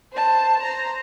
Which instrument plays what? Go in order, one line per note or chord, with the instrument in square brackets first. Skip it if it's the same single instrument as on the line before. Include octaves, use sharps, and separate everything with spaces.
[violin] C5 A5
C5 A#5